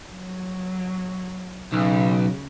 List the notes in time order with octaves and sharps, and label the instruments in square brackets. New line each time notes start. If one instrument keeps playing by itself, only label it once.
[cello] F#3
[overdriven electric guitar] B1 [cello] C#3